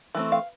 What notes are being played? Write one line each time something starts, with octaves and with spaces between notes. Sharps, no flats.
E3 A3 C4
F5